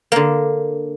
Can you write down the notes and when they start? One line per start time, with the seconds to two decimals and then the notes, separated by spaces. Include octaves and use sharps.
0.12 D3 A#3